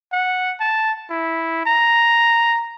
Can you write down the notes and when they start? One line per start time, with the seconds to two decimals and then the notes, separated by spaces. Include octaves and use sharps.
0.13 F#5
0.60 A5
1.10 E4
1.66 A#5